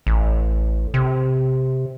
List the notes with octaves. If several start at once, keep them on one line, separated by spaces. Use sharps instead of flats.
A1
C3